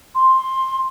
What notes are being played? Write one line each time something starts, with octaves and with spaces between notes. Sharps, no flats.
C6